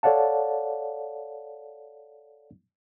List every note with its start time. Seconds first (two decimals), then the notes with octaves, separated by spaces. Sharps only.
0.03 A4 C#5 D5 F5 F#5 A5